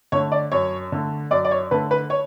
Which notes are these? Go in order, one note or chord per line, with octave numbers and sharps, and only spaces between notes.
D3 A3 C#5
D5
F#2 C#5
D3 A3
F#2 D5
D5
C#5
D3 A3 B4
B4
C#5